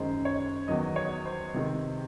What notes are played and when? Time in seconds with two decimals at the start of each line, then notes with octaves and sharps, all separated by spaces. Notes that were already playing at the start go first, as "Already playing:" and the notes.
Already playing: F#2 D#3 G#3 C5
0.25 C#5
0.68 E2 D#3 F#3 D#5
0.96 C#5
1.26 C5
1.54 C3 D#3 G#3